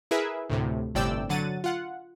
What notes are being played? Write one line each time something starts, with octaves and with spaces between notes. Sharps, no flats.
E4 G#4 A#4 B4 E5
D2 A2 C3
G1 A2 C3 D5 G5 E6
D3 F#3 F#5 A6 D#7
F4 F#5